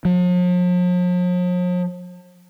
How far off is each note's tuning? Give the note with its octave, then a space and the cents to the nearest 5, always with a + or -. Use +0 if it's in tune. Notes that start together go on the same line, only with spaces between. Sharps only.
F3 +45